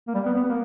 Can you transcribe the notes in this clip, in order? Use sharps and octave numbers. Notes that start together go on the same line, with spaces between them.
A#3
G3
B3
B3
A#3